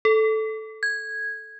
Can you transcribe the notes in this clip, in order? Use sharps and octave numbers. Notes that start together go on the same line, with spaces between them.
A4
G#6